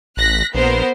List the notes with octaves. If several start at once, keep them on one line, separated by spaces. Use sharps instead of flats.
A1 F#6 A#6 B6
A#1 B3 A#4 C5